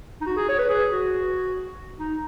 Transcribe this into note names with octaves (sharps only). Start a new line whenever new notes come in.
D#4
F#4
G#4
C#5
B4
G#4
F#4
D#4